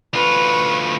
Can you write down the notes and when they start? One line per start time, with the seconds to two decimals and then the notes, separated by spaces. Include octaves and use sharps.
0.13 D2 F4 B4 C#6